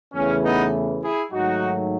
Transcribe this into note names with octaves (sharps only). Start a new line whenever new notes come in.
E2 C#3 E3 A3 C#4
B3 D#4
E4 G#4
G#2 D#3 F#3 A3 D#4 F#4